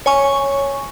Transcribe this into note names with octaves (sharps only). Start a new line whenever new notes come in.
C#5 G#5 C#6